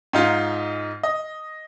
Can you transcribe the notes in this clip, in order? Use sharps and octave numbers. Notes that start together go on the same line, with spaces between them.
G#2 D#4 F4
D#5